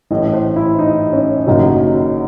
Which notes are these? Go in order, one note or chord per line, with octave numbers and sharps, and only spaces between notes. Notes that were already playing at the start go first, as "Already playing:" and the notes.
A1 A2 E3 D#5
C5
E4
D#4
C#4
F#1 F#2 D#3 F#3 D#4